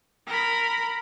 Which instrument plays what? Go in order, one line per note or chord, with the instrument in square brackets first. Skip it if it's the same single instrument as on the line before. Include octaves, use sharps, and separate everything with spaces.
[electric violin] A#4 B5